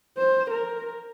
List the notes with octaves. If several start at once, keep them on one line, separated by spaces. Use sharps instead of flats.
C5
A#4